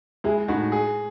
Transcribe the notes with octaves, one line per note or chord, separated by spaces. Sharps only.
G#3 E4 G#4
A2 D#4 F#4
G#4